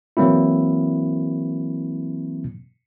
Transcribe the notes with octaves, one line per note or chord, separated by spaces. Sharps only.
E3 F#3 A#3 C4 E4